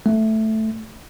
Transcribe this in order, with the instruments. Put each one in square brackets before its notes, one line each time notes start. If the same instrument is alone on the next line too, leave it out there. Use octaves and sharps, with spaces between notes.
[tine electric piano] A3